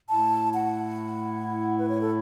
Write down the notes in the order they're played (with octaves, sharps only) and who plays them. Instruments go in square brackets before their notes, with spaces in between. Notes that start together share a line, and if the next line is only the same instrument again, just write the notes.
[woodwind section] A2 A3 E4 [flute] A5
[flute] F#5
B4
C#5
A4